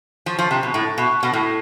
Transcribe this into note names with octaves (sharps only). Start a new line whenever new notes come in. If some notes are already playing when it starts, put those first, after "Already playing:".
F3
F3
C3
B2
A2
B2
B2
A2